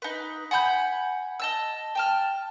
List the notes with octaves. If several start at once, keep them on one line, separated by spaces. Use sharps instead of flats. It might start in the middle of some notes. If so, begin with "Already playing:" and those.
D#4 B4
F#5 G#5 B5 G6
D#5 A5 E6
G5 A5 F6